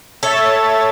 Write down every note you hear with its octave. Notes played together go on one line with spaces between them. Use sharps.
A4 C#5 E5 A6